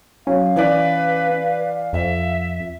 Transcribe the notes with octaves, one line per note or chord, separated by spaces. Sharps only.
F#3 C#4 F5
E3 B4 D5
F2 E5